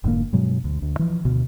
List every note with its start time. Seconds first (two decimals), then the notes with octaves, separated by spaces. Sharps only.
0.04 F1 G#2 D3 A#3
0.33 G2 B2 F#3 G#3
0.64 D2
0.82 D2
0.99 E3 F3
1.25 D2 B2